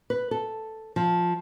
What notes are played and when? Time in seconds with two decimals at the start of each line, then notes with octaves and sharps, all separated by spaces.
0.10 B4
0.31 A4
0.96 F3